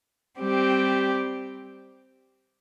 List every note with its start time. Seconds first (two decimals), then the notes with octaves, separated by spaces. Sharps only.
0.38 G3 C4 G4